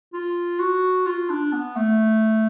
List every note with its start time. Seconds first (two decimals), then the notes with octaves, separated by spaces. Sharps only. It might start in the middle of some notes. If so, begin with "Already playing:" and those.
0.14 F4
0.60 F#4
1.07 F4
1.30 D4
1.52 B3
1.76 A3